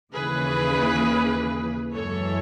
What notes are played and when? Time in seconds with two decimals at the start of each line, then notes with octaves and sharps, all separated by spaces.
0.13 D#2 C#3 E3 G#4 B4
1.93 F#2 E3 G#3 A4 C#5